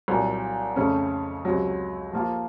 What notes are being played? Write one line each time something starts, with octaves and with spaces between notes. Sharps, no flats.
C2 A#2 F#3
F2 C#3 A3 C#4
C#2 C3 F#3
F3 A#3 F4